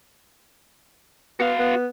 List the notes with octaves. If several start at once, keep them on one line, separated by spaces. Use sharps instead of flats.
B3 F#4 F5
B3